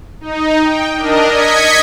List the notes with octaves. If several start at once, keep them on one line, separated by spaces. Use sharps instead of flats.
D#4
G5
D4 A#4 D#5
D#5 G#6 B6 C#7